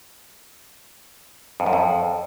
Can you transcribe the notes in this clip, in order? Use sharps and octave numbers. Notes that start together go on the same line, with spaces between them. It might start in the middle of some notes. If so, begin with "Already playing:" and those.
F2
F#2
F2